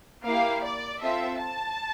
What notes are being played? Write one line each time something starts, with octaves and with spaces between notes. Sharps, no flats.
A#3 E4 G4 F5
D5
C4 F4 A4 E5
A5